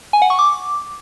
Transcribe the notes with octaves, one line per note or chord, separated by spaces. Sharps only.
G#5
F#5
C#6
D6